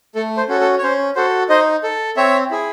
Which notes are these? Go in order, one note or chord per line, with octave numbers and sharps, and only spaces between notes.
A3 A4
C5
C#4 F#4 A4
A4
C#5
C#4 C5
F#4 A4 C5
D#4 C5 D#5
A4
C4 C#5 E5
E4 G#4